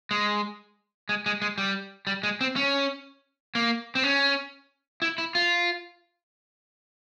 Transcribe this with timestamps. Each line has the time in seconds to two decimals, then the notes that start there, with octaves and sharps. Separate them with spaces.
0.11 G#3
1.09 G#3
1.26 G#3
1.42 G#3
1.58 G3
2.07 G3
2.23 G#3
2.41 C4
2.56 C#4
3.55 A#3
3.95 C4
4.04 C#4
5.02 E4
5.18 E4
5.35 F4